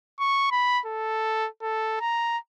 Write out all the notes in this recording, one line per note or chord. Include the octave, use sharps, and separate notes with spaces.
C#6
B5
A4
A4
A#5